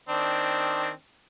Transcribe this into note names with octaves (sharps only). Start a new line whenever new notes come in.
D#3 C4 D4